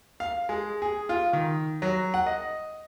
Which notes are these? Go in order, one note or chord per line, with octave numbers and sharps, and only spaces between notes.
F5
G#3
G#4
F4
D#3
F#3
F#5
D#5